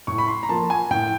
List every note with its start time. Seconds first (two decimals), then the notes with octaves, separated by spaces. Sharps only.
0.07 A2 C#6
0.18 B5
0.28 C6
0.43 A#5
0.49 F3 A#3 A5
0.70 G#5
0.91 A2 G5